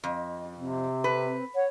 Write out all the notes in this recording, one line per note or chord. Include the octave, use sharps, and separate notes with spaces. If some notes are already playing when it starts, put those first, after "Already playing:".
F2 D#5
C3 C4
B4
C4
C#5 F#5